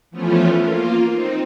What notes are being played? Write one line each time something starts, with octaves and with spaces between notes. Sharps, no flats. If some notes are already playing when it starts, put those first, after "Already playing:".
E3 F3 A3 B3 C#4 F4
A#3 F4
C4 D#4